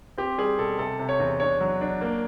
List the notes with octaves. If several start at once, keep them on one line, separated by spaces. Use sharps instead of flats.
C4 G4
G3 G#4
B2 A4
C3 A4
C3
C#5
E2
D4 C#5
F#3
D4
A#3